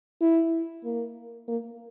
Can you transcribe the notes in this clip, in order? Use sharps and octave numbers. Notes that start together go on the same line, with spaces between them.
E4
A#3
A#3